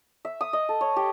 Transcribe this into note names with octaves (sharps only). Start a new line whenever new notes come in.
E5
D#6
D#5
A4
C#5
G4